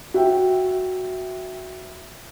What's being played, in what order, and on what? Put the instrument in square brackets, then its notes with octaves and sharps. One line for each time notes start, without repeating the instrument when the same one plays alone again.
[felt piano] F#4 E5 G5